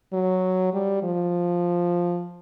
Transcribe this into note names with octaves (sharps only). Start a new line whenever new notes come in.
F#3
G3
F3